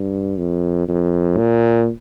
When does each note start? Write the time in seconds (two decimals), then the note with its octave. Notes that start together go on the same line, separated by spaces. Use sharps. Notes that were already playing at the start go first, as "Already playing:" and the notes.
Already playing: G2
0.38 F2
0.88 F2
1.37 A#2